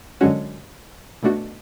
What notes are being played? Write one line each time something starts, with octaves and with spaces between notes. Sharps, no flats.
F#2 D3 G#3 C#4 F#4
B2 A3 D4 F#4